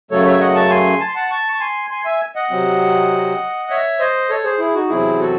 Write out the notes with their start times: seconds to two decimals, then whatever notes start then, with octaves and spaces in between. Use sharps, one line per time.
0.11 F#2 C#3 F#3 A3 A4 C#5
0.25 C#5 E5
0.41 D#5 F#5
0.55 A5 C#6
0.70 G#5 C6
1.00 A5
1.08 C6
1.15 F#5 A5
1.31 A5 C#6
1.53 C#6
1.60 G#5 C6
1.90 G#5 C6
2.05 E5 G#5
2.36 D#5 F#5
2.50 C3 F#3 C4
3.70 C#5 E5
3.99 C5 D#5
4.30 A4 C#5
4.44 G#4 C5
4.59 E4 G#4
4.74 D#4 F#4
4.89 E2 C3 F#3 C4 E4 G#4
5.19 F#4 A4